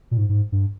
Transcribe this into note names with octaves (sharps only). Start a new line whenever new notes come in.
A#2
G#2
G#2
G2